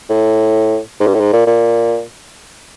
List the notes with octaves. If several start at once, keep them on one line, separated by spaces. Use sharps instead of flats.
A2
G#2
G2
A2
G#2
A#2
A#2